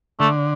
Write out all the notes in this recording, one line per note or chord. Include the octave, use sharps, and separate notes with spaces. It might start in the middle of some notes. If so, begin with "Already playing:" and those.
D3 A3